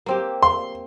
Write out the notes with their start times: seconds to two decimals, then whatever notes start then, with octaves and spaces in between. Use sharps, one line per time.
0.06 A#3 C4 G4
0.43 C6